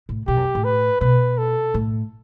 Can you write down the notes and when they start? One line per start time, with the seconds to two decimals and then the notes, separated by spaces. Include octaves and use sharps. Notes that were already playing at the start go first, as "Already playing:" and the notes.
0.09 A2
0.27 B2 G4
0.36 F#2
0.55 A2
0.64 B4
1.01 B2 B4
1.38 A4
1.74 A2